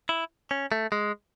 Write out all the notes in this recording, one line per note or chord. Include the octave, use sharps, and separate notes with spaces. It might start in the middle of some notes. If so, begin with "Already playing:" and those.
E4
C#4
A3
G#3